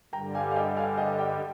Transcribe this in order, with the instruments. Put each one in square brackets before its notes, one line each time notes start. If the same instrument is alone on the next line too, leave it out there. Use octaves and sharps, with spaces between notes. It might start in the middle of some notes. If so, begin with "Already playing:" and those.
[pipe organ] G2 D3 G3 [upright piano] G5 A#5
[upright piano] F5 G#5
F5
D#5 G5
F5 G#5
D#5 G5
D#5 G5